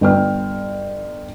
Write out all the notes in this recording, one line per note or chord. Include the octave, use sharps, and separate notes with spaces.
G1 G5 F6